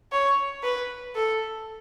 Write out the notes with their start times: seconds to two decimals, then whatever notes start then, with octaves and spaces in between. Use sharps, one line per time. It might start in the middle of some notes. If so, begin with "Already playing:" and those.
0.12 C#5
0.63 B4
1.15 A4